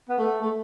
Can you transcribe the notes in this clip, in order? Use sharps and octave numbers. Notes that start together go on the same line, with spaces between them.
B3
A3
A3